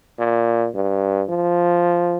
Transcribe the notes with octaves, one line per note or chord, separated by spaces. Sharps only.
A#2
G2
F3